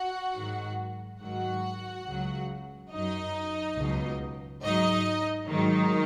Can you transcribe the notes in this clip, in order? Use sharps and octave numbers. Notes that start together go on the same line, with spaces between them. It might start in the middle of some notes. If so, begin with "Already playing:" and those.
Already playing: F#4 F#5
G#2 D#3 F#3
G#2 D#3 F#3 F#4 F#5
C#2 C#3 F#3
F#2 F#3 D#4 D#5
C#2 B2 F#3
G#2 F#3 D#4 D#5
G#2 D#3 F#3 D#4